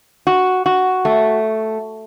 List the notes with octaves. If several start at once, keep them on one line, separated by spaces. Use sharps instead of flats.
F#4
F#4
A3